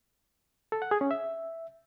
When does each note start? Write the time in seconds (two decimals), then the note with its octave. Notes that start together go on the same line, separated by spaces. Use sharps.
0.72 A4
0.82 F#5
0.91 G#4
1.01 C#4
1.11 E5